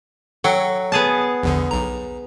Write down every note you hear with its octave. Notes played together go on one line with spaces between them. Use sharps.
F#3 A4 F#5 G5
B3 G#4 A5
A#1 E2 D3
B1 A#5